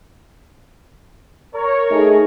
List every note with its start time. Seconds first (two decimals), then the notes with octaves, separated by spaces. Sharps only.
1.55 A#4 C#5
1.91 A3 D#4 G#4